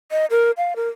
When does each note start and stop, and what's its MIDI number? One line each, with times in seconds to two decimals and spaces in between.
0.12 0.26 75
0.31 0.51 70
0.57 0.74 77
0.76 0.89 70